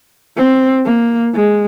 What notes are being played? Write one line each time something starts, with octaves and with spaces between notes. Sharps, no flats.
C4
A#3
G#3